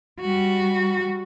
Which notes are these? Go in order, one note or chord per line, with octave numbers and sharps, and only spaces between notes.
G3 F#4